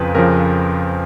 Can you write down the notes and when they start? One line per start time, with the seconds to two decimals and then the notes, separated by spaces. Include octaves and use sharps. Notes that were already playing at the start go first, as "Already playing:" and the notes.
Already playing: F2 C#3 F3 B4
0.15 F2 C#3 F3 A#4